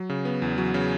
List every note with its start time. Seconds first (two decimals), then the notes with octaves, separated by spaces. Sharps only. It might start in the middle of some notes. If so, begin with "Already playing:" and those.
Already playing: F#3
0.10 C#3
0.25 B3
0.42 E2
0.58 F#3
0.74 C#3